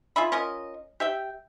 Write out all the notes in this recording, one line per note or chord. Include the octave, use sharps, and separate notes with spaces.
F4 G#4 E5 B5
C#4 F4 A#4 D#5
G4 E5 G5